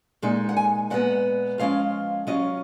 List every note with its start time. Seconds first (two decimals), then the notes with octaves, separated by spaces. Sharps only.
0.22 A#2 G#3 D#4
0.49 F#5
0.57 G#5
0.90 A#2 G#3 B3 F#5
1.58 F3 G#3 C#4 F4 F5
2.27 F#3 C#4 F4 D#5